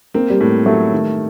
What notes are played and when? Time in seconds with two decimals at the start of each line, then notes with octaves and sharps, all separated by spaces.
0.14 A#3 C4
0.30 G3
0.40 A2 A3
0.66 F#3 A3
0.92 D#3